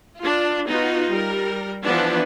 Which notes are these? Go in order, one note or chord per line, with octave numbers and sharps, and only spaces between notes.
D4 F4
B3 D#4 F4 F#4
G3 A#4
E3 F3 B3 D4